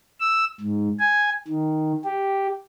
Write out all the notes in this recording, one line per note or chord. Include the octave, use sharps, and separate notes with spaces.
E6
G#2
G#5
D#3
G4